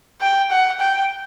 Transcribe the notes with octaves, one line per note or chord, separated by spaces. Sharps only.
G5
F#5
G5